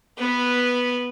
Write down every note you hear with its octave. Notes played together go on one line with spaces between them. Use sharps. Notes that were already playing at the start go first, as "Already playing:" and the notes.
B3 B4